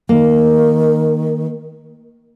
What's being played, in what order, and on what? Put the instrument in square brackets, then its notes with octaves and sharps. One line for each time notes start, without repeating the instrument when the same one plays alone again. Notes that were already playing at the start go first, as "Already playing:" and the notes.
[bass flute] D#3 [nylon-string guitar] A#3